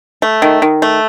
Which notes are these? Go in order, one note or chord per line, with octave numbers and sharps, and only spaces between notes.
A3
D#3
D#3
A3